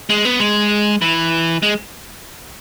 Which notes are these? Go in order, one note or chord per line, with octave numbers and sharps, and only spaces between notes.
G#3
B3
G#3
E3
G#3